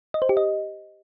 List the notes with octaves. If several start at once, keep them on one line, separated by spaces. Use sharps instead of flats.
D#5
C5
G4
D#5